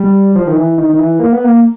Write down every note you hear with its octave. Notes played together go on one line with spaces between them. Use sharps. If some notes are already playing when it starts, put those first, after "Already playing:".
Already playing: G3
F3
D#3
E3
D#3
D#3
E3
A#3
B3
A#3